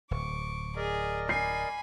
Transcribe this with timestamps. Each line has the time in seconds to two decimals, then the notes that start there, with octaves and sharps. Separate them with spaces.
0.11 D1 C#6 D6
0.76 G#4 A#4 D5 D#5
1.29 G#5 B5 C7